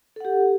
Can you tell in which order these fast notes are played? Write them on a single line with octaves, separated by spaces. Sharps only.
A4 F#5 G4